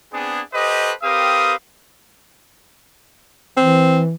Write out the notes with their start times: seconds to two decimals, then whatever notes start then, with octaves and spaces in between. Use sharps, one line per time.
0.13 B3 C4 D4 G#4
0.54 G4 A4 B4 C5 D#5
1.03 C4 G4 A#4 B4 F5 D#6
3.57 E3 C4